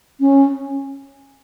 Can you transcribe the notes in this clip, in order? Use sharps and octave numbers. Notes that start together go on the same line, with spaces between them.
C#4